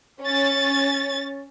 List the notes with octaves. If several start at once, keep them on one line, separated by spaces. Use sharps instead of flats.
C#4 A6